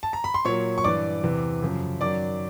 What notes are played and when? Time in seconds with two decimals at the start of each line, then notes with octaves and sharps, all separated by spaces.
0.03 A5
0.13 A#5
0.24 B5
0.34 C6
0.45 A#2 F#3 C#5 C#6
0.78 C#6
0.84 G2 E3 D5 D6
1.23 E2 C3 E3
1.62 F#2 C#3 F3
2.01 F#2 D#3 F#3 D5 D6